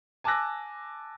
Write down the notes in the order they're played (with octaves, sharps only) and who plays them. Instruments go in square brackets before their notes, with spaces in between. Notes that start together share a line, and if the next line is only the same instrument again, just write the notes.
[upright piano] G#5 A5 D6 E6 F#6 A#6